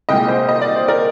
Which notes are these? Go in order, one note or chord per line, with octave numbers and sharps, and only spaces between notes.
C2 A#2 G#3 D#5 G5
C5 D#5
D#5
D5
C5
A#4 D5